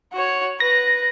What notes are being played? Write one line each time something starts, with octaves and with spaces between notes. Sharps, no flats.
F#4 C#5
B4 A#6